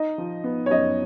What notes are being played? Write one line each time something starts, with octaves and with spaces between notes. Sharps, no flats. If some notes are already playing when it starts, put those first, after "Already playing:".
Already playing: D#4 D#5
F3
B3
C#5
F#2 D#5